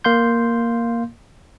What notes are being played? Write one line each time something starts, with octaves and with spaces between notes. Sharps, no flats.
A#3 F5 C6 G6